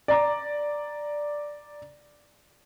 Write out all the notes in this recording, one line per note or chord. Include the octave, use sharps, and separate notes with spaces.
D5 A#5 D6